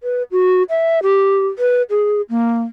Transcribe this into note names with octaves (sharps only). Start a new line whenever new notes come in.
B4
F#4
E5
G4
B4
G#4
A#3